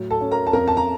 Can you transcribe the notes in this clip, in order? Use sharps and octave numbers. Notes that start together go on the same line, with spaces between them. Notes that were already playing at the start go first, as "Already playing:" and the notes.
Already playing: A2 F#3
A4 A5
C#4
A#4 A#5
A5
F2 A#4 A#5
A5
A#5